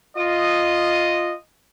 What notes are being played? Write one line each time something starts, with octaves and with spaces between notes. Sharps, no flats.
F4 D#5